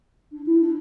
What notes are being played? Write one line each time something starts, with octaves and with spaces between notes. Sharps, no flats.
D4
E4
D4